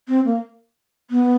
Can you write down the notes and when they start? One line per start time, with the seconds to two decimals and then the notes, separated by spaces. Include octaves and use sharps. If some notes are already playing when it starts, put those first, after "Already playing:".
0.08 C4
0.25 A#3
1.10 B3